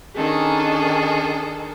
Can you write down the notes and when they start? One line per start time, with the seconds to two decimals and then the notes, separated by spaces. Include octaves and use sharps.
0.17 D#3 C#4 D4 G#4 A4